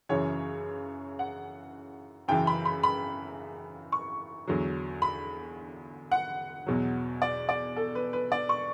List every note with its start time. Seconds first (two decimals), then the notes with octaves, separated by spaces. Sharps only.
0.09 F#2 C#3 E3 C#5
1.19 F#5
2.28 F#2 C#3 E3 G5
2.47 B5
2.65 B5
2.83 B5
3.92 C#6
4.47 E2 D3 F#3
5.02 B5
6.12 F#5
6.67 E2 B2 F#3
7.22 D5
7.49 D5
7.76 A4
7.95 B4
8.13 B4
8.32 D5
8.49 C#6